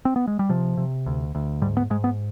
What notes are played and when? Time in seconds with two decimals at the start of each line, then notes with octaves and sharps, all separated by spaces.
0.05 C4
0.16 B3
0.27 G#3
0.39 G3
0.49 C3 F3
0.77 C3
1.06 D2
1.35 D2
1.62 G#2 G3
1.77 B3
1.90 G#2 G#3
2.04 B3